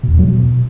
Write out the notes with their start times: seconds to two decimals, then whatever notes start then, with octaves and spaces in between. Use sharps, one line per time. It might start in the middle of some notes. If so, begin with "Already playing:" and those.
0.03 B2
0.09 E2
0.14 F2
0.19 F#3
0.24 B2